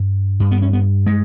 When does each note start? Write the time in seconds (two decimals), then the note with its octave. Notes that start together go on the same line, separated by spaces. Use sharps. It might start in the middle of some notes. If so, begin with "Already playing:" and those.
Already playing: G2
0.40 G2
0.51 B3
0.62 C#4
0.73 B3
1.07 G#3